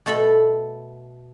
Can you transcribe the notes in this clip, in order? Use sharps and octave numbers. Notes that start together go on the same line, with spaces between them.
B2 A3 A4 E5 B5